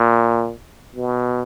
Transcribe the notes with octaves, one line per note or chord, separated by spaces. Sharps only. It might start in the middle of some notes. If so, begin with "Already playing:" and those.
Already playing: A#2
B2